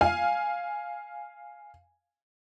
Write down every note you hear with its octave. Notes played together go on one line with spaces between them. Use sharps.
F5 G#5